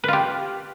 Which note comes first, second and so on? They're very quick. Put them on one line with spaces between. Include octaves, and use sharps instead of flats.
B4 F4 G4